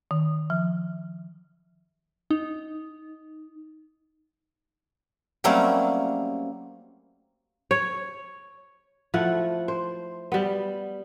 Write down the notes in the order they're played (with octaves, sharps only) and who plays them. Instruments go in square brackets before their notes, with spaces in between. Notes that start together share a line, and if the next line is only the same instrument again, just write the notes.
[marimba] D#3
F3
[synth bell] D#4
[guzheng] F#3 G3 A3 A#3 C4 C#4
[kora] C#5
F3 A3 E4 F#5
C5
G3 B3